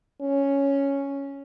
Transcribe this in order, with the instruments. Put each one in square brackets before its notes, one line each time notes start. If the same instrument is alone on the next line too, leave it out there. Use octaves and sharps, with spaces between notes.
[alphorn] C#4